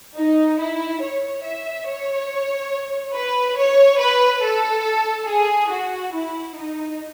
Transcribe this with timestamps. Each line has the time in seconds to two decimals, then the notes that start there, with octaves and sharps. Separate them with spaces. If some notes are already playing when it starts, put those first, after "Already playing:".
0.16 D#4
0.59 E4
1.01 C#5
1.43 E5
1.86 C#5
3.13 B4
3.57 C#5
3.99 B4
4.42 A4
5.27 G#4
5.70 F#4
6.13 E4
6.55 D#4